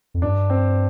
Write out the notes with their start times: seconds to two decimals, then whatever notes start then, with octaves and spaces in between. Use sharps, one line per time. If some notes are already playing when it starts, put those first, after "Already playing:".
0.14 F2
0.22 G2 D4
0.50 C4